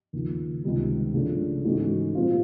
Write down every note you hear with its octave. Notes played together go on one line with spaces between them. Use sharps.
D#2 C#3 F3
C#2 C3 D#3 G3
C#3 F3 A3 D4
G#2 E3 A3 C#4 F#4
A#2 G3 C4 F4